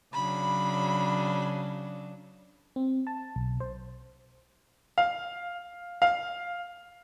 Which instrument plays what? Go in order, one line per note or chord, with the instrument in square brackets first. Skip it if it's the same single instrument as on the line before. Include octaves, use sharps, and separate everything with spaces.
[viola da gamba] C#3 F#3 D4 [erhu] B5
[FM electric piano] C4
A5
B1
C5
[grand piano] F5
F5